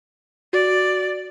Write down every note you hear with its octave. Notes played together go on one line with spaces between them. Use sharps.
F#4 D5